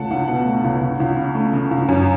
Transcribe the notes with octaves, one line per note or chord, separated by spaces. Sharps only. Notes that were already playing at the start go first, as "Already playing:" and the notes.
Already playing: C#2 A3 F#5 A5
C#2 F#5
B2 F#5
A3
C#2
C#2
C#2
C#3
A3
C#3
C#2
F#2